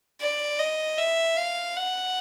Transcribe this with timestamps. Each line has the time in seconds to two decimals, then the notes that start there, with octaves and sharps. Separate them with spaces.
0.21 D5
0.59 D#5
0.98 E5
1.37 F5
1.77 F#5